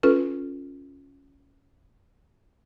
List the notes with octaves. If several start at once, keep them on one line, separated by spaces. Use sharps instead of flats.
C#4 F4 A4 B4